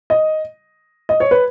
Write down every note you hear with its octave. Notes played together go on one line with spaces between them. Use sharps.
D#5
D#5
C#5
B4